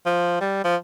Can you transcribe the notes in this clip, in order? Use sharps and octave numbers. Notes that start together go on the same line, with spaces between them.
F3
G3
F3